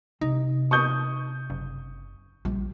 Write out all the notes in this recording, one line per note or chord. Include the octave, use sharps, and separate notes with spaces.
C3 D#4
C#6 D#6 G6
F#1
A#1 G3